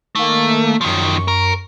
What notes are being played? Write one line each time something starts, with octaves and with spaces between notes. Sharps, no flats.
D#3 A3 A#3
F#2 D#3 F3 C#6
A#4